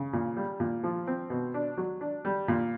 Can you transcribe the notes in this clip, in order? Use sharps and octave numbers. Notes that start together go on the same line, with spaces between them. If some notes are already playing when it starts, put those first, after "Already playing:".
Already playing: C#3
A#2
G3
A#2
F3
C4
B2
D4
F#3
D4
G3
A#2